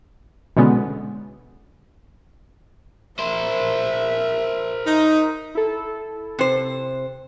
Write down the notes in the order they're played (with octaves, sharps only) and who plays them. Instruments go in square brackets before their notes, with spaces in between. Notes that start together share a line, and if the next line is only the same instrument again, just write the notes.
[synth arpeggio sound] B2 D3 G#3 B3 C#4
[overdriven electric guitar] A#4 C5 [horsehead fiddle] E5
[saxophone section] D#4
[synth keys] E4 A4
[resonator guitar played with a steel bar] C3 C5